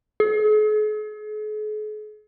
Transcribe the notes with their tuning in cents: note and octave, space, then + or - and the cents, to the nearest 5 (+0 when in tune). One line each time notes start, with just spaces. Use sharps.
G#4 +45